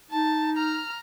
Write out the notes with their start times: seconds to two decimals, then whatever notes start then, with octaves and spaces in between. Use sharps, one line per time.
0.11 D#4 A5
0.57 A#5 F6